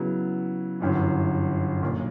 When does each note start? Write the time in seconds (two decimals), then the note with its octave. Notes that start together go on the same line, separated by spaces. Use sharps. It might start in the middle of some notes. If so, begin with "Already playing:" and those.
Already playing: C#3 F#3 B3 E4
0.80 G1 F#2 E3
1.83 B1 A#2 A#3